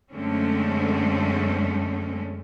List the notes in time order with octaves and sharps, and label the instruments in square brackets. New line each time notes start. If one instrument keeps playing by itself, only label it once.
[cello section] F#2 D3 G#3 A3 C4 C#4